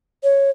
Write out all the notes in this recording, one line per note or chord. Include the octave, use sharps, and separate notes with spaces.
C#5